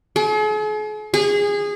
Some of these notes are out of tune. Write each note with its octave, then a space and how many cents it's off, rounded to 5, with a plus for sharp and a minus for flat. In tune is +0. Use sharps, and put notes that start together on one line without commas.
G#4 +45
G#4 -20